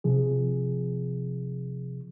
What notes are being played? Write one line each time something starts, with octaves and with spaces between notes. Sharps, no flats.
C3 F3 G#4